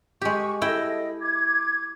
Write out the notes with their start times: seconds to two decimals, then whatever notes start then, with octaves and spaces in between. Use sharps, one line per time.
0.21 G#3 G4 C#6
0.62 E4 A4 D#5 G5
1.20 D6 G#6